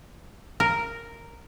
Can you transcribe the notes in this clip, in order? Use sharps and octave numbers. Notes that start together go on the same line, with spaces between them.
A#4